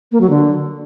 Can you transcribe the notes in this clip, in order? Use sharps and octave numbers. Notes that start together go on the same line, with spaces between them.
A#3
F#3
D3